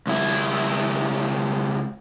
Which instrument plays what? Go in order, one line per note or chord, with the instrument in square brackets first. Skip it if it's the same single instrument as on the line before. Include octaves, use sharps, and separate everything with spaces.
[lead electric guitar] C#2 E4